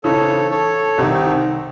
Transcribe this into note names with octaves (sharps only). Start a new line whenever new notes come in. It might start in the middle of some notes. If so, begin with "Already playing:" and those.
C#3 E3 C4 D#4 A4 C#5
A4 C#5
C2 C3 D#3 C4 D#4